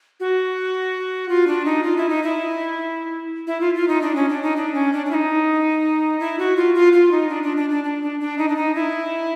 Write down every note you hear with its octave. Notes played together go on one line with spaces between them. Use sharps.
F#4
F4
D4
D#4
F4
E4
D#4
E4
E4
F4
F4
D#4
D4
C#4
D4
D#4
D4
C#4
D4
D4
E4
D#4
E4
F#4
F4
F4
F4
D#4
D4
D4
D4
D4
D4
D4
D4
D#4
D4
D#4
E4